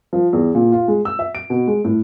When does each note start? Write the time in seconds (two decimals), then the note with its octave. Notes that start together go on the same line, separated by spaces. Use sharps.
0.13 F3
0.33 E2
0.55 A#2
0.72 F4
0.88 G#3
1.05 E6
1.19 E5
1.35 D7
1.50 B2
1.68 G#3
1.85 A2